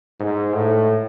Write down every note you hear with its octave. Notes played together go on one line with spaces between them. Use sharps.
G#2
A2